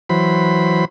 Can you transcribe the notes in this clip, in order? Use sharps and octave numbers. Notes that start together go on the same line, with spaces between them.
E3 F#3 C5 B5